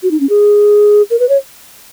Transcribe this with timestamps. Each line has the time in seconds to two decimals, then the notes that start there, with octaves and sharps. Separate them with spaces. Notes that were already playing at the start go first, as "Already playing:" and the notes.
0.03 F#4
0.11 D#4
0.20 C#4
0.29 G#4
1.10 A#4
1.20 B4
1.29 C#5